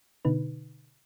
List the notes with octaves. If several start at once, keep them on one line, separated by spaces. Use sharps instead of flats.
B2 D3 D#4 B4